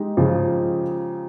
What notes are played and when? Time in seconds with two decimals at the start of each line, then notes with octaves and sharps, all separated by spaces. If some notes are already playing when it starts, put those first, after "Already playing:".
Already playing: G#3 D#4 G4
0.17 C#3 F3